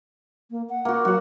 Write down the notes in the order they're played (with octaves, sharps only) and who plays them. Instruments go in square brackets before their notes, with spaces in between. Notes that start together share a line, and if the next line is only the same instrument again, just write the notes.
[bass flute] A#3
F#5
[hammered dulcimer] A#3 F#4
[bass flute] F#3 [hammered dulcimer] F#4 F#5